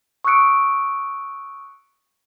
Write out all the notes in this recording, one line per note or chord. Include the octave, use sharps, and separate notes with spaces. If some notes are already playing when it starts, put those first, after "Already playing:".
C#6 D#6 E6 F#6 C#7 D7